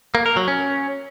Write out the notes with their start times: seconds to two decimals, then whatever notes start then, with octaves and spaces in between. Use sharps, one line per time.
0.15 A#3
0.26 A#4
0.37 F#3
0.48 C#4